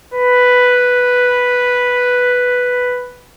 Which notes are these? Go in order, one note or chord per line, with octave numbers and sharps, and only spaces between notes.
B4